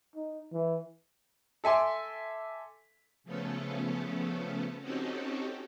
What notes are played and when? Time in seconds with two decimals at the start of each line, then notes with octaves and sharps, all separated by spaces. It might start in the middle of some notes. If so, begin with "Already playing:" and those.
0.16 D#4
0.52 E3
1.64 A4 E5 G#5 C6 D6
3.24 C#3 F3 A3 B3 C#4 A4
4.80 C4 C#4 D#4 F#4 G4 A4